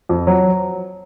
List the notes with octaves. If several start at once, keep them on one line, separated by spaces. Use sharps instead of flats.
F2
F#3